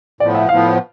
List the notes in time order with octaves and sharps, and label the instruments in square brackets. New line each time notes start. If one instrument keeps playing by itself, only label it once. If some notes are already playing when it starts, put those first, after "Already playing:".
[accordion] A2 F3 B3 [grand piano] D5
[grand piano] E5
[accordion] A2 F3 B3 [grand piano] F5